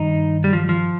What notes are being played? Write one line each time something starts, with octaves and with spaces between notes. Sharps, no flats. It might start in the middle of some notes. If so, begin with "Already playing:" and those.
Already playing: G2 D#3 D#4
G3
F3
F3